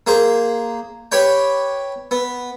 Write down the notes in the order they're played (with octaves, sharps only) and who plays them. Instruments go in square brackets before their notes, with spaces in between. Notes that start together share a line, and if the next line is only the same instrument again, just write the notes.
[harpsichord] A#3 G#4 C5
G4 B4 C#5 G5
B3